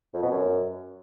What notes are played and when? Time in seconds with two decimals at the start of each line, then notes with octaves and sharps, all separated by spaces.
0.14 F2
0.22 B2
0.31 F#2